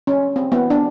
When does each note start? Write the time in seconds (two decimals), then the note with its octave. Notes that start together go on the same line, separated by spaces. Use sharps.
0.07 C#4
0.36 C4
0.52 B3
0.70 D4